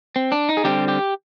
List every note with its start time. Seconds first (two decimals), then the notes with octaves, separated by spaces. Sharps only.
0.16 C4
0.32 D4
0.49 D#4
0.57 G#4
0.64 D3 G3 C4 G4
0.88 G4